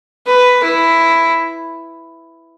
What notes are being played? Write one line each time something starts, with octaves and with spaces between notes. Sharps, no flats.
B4
E4